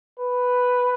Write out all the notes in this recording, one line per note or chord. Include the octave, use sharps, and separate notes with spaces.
B4